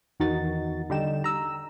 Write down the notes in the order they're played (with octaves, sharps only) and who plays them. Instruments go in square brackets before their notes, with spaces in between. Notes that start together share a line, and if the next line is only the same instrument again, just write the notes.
[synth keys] E2 D#3 D#4 F#4 A6
D3 G3 D#4 G5 E7
A#5 E6